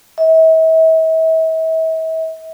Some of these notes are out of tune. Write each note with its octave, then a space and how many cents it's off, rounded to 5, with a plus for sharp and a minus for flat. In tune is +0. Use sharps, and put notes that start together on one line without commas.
E5 -40